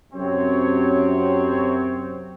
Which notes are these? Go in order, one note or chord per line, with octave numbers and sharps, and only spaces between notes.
F#2 C3 C4 C#5